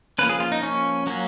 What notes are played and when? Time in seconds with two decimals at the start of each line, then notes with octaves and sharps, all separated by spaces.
0.18 F3 A#3 C#4 B4
0.29 G#4
0.40 F4
0.52 D#4
0.63 C#4
1.07 F#3 A#3 C#4